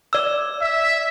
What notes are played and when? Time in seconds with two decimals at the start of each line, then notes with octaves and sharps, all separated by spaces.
0.13 D5 E6
0.61 E5